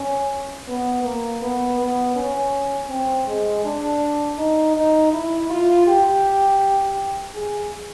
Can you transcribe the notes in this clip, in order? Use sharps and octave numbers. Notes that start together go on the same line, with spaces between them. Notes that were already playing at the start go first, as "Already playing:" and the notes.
Already playing: C#4
B3
A#3
B3
B3
C#4
C4
G#3
D4
D#4
D#4
E4
F4
G4
G#4